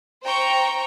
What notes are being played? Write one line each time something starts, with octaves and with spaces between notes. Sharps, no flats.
C5 G5 A#5 C#6